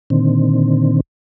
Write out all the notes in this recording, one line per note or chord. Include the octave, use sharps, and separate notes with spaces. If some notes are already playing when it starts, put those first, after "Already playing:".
A#2 D3 D#3 C4